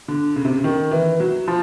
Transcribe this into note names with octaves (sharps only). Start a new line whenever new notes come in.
D3
C#3
C3
C#3
D#3
E3
F#3
F3